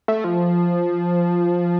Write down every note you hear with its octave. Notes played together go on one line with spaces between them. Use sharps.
A3
F3